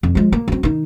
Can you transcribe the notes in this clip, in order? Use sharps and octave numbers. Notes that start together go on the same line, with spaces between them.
F2
F3 G#3
A#3
F#3 C4
D#3 D#4